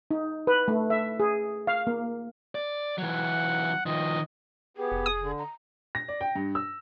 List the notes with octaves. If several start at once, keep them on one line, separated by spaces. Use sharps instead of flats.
D#4
B4
A3
E5
G#4
F5
A#3
D5
E3 F#3 F#5
D#3 F3 D#5
B3 G4 G#4
F1
D#6
D3
A#5
A#6
D5
G5
G2
E6